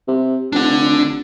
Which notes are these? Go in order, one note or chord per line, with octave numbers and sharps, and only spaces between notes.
C3
F1 D4 F#5